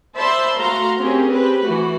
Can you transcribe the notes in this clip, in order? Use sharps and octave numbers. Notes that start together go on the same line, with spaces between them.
C5 D5 E5 A5 B5 C6
A3 F#4 F5 A#5 C6
C4 C#4 G4 G#4 A#4
C4 G4 B4
E3 A3 F#4